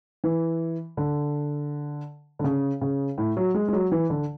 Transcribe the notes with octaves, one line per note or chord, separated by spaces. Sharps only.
E3
D3
D3
C#3
C#3
A2
F#3
G#3
G#3
F#3
E3
D3